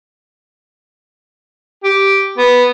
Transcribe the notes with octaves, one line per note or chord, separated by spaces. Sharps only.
G4
B3